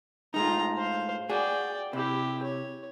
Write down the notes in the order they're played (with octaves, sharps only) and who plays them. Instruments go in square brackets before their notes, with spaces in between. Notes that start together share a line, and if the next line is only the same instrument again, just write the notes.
[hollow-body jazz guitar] A2 G#3 D#4 [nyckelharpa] F4 A#5
[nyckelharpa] C5 F5
[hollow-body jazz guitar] F#4 G#4 [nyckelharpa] D5 G5
[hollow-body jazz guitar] C3 [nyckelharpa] E4 G4
[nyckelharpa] C#5